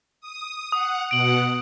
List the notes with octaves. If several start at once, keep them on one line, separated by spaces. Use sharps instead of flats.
D#6
F#5 D#6
B2 F#5 D7 F#7